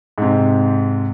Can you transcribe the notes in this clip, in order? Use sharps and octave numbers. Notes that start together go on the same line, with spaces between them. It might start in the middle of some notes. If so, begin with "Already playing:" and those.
G#2 C3